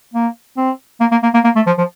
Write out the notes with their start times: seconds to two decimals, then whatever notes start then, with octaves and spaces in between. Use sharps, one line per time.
0.14 A#3
0.57 C4
1.01 A#3
1.12 A#3
1.23 A#3
1.34 A#3
1.44 A#3
1.56 A3
1.67 F3
1.78 F3